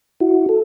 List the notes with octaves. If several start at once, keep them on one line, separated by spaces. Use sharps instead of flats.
E4 F#4
A4